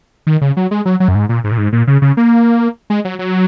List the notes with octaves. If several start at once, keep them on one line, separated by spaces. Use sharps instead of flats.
D#3
C#3
F#3
G#3
F#3
F#3
F#2
G#2
A#2
G#2
A#2
G#2
A#2
C#3
C#3
A#3
G#3
F#3
F#3